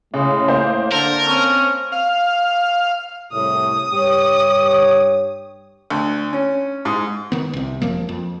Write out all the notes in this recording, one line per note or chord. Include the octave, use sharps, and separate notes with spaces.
A2 C#3 G#3
A#3 C5 F5
D3 A4 A#4
C4 C#4
F5
C2 A2 D#6
G2 G4 C#5
D2
C#4
G#2
D#3 B3
C2 C3
F#1 F2 F3 A#3
F2